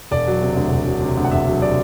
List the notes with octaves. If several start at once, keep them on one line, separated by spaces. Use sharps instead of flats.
E1 D5
F#3
C3
D2
E1
F#3
C3
D2
F#5
E1 E5
F#3
C3 D5